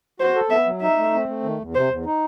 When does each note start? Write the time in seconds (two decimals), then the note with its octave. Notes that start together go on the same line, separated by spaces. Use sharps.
0.20 F#4 C5
0.36 A4
0.50 B3 E5
0.66 F#3
0.82 D#4 E5
0.98 A3
1.13 C4
1.29 A3
1.43 D#3
1.59 E2
1.75 C3 C5
1.90 E2
2.06 D#4